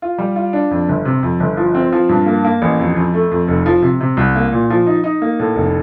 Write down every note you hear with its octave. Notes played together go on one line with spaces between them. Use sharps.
F4
G3
F4
D4
F2
G1
C3
F2
G1
F3
C4
F3
G2
A#3
A#3
A1
F2
F2
A3
F2
F1
F3
C3
C3
C2
A#3
A#2
F3
D#4
D#4
A#3
A2
F1